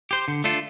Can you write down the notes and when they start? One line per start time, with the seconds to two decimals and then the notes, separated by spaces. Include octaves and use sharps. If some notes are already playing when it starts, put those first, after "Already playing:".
0.11 G4 C5
0.28 D3
0.44 A3 D4 F4 A4